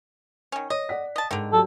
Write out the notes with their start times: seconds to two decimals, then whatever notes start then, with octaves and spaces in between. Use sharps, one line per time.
0.52 D#3 C#4
0.70 C#5 D#5
0.89 D5 F#5 B6
1.16 D#5 A5
1.31 G#2 D3 D#3
1.53 F#3 G4 A4